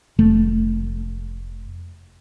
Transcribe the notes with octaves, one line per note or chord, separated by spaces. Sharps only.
F1 A3